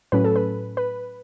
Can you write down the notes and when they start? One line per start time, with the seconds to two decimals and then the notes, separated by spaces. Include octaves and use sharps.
0.12 A2 F#3 C#4 B4
0.24 A4
0.36 B4
0.77 B4